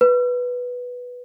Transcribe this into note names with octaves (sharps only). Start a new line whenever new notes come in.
B4